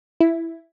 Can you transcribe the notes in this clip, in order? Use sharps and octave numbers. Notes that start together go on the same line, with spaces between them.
E4